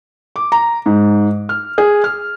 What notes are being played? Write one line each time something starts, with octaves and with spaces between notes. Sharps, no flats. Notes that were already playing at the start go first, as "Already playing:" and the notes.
D6
A#5
G#2
F6
G#4
F6